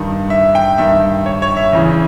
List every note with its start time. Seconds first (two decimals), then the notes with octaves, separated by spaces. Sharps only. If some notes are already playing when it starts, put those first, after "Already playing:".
Already playing: G2 D#3
0.30 E5
0.55 G5
0.78 G2 D#3 E5
1.26 C#5
1.42 C#5
1.57 E5
1.73 E2 C#3 E3